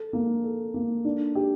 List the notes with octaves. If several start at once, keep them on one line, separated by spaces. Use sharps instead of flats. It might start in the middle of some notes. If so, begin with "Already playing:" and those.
Already playing: A4
A#3
A4
A#3
D4
G4